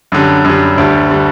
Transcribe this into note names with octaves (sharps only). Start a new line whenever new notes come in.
F#2 D3 G3
F#2 D3 G3
D2 D3 G3
D3 G3